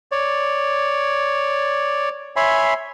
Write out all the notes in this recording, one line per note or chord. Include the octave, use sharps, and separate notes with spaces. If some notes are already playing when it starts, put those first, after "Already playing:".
C#5 D5
C#5 E5 G#5 B5 C6